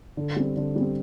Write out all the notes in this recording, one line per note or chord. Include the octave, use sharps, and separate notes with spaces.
D3
G3 C4
D3
G3
C4